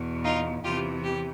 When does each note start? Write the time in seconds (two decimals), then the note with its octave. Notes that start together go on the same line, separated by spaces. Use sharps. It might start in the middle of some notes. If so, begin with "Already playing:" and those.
Already playing: E2 B2
0.24 D#4 F4
0.64 E2 C3 E3 F4 G4
1.03 G4